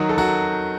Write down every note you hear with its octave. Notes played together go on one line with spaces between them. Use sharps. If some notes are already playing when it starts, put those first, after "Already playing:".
Already playing: D#3 F#3 D#4 F#4
A4
F#3 F#4